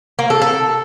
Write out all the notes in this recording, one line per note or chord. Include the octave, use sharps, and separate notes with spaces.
A#3
A4
A4